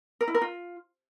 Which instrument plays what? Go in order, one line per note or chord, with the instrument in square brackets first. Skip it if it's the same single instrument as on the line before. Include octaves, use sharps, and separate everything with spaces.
[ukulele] A#4
E4
A#4
F4